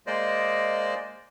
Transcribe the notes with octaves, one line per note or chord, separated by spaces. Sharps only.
G#3 A#3 C5 D5 D#5